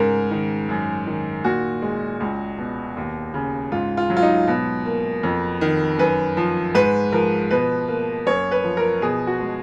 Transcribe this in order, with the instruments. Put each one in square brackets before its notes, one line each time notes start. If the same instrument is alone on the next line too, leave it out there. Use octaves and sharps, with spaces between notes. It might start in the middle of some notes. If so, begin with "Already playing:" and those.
Already playing: [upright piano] G#2 C#3 A#4
D#3
F#2
D#3
A#2 F#4
G#3
C#2
B2
D#2
C#3
G#2 F4
F4
F#3
F4
D#4
B2
A#3
F2
D#3
F#2 B4
F3
G#2 B4
F3 A#4
B2 B4
A#3
F#2 C#5
B4
F3
A#4
B2 G#4
F#4
G#3